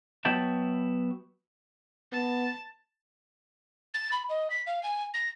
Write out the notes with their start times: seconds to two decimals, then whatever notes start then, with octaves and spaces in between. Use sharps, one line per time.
0.25 F#3 B3 F#4 E5 G5 A5
2.12 B3 A5
3.94 A6
4.12 B5
4.29 D#5
4.50 B6
4.67 F5
4.83 G#5
5.14 A#6